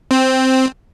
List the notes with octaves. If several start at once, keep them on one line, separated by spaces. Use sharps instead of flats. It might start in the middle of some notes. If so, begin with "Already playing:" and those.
C4